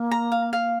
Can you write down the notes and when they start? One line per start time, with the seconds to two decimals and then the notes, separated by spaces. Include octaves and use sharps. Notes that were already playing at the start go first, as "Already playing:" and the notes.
Already playing: A#3
0.11 A#5
0.32 F5
0.53 F5